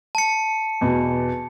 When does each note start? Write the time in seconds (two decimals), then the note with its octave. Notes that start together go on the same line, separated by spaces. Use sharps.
0.15 A5 C#7
0.81 E2 B2